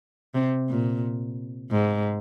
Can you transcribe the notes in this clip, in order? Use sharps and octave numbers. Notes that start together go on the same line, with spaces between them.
C3
A#2
G#2